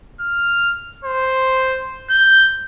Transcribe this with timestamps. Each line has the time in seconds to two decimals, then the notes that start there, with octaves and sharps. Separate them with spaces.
0.20 F6
1.04 C5
2.10 G6